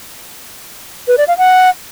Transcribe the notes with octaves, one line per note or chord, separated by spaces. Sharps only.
B4
D5
F5
F#5